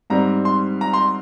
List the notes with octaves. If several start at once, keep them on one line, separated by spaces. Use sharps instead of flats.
G#2 G3 C4 A#5
C6
A#5
C6